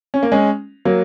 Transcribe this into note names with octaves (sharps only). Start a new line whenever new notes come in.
C#4
A#3
G#3 C#4
F#3 A#3